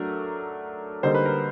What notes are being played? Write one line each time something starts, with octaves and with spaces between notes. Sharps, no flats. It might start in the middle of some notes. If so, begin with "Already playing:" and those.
Already playing: F#3 A3 D4 A#4
D3 G3 A#3 D#4 C5
B4
A#4